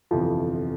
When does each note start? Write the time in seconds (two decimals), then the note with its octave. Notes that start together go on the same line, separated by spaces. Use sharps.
0.11 G1 F2 C3 E3 F3